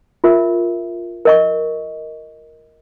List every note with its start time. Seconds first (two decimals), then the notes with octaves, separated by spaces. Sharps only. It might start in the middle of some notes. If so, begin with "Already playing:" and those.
0.24 F4 A#4 E5
1.25 A#4 D#5 C#6